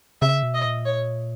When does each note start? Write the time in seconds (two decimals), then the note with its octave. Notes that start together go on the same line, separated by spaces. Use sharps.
0.22 C#3 E5
0.43 B2
0.54 D#5
0.65 A#2
0.85 C#5